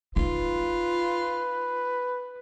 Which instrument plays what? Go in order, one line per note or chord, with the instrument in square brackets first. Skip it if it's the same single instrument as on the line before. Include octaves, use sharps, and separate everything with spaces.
[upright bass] D#4 [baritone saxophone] F4 [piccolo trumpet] B4